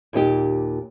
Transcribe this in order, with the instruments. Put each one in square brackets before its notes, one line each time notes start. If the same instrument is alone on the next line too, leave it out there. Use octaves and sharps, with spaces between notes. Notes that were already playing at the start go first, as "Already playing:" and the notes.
[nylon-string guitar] D#2 A#2 D#4 G4